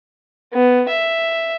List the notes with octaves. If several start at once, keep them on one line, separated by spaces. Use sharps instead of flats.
B3
E5